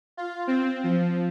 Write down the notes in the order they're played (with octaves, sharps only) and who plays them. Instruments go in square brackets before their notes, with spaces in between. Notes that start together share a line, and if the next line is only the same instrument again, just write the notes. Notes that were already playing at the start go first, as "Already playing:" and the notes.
[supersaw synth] F4
C4
F3